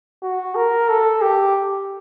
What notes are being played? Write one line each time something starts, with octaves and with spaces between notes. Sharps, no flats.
F#4
A#4
A4
G4